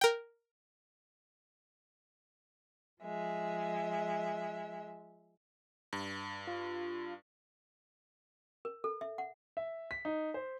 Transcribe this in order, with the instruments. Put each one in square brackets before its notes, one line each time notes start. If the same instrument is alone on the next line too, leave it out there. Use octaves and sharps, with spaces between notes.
[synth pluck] A#4 G5
[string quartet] F3 G#3 E5
[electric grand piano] G2
[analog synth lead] F4
[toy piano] A#4
A4
E5
F#5
[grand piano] E5
B6
D#4
C5